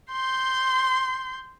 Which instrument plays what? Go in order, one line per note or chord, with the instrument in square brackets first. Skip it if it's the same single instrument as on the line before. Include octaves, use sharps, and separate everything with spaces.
[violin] C6 G6